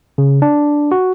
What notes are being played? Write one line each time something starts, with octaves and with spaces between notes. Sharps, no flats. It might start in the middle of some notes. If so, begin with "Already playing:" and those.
C#3
D4
F#4